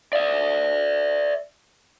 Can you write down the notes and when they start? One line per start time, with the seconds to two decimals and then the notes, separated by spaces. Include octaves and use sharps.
0.13 D5 E5